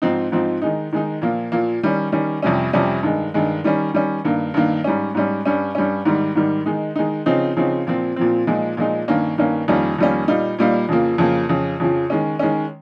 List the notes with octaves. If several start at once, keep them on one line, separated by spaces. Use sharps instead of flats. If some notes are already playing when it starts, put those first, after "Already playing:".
G#2 F3 C4 D#4
G#2 F3 C4 D#4
D#3 G#3 D#4
D#3 G#3 D#4
A#2 F3 A#3
A#2 F3 A#3
D#3 G3 C#4
D#3 G3 C#4
F2 C3 G3 C#4
F2 C3 G3 C#4
G2 D#3 G#3
G2 D#3 G#3
D#3 G3 C#4
D#3 G3 C#4
G2 D#3 A#3
G2 D#3 A#3
G#2 G3 C#4
G#2 G3 C#4
G2 G3 C#4
G2 G3 C#4
G#2 D#3 G3
G#2 D#3 G3
D#3 G#3 D#4
D#3 G#3 D#4
C#3 F3 C4 D#4
C#3 F3 C4 D#4
A#2 F3 C4
A#2 F3 C4
A#2 F3 G#3 D#4
A#2 F3 G#3 D#4
G2 D#3 A#3 C#4
G2 D#3 A#3 C#4
F2 D#3 G3 A#3 C#4
F2 D#3 G3 A#3 C#4
A#2 G3 A#3 D#4
A#2 G3 A#3 D#4
F2 C#3 F3 A#3
F2 C#3 F3 A#3
F2 C#3 F3
F2 C#3 F3
D#3 G#3 C#4
D#3 G#3 C#4